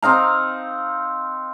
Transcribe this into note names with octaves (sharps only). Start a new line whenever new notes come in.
C4 D#4 F5 A#5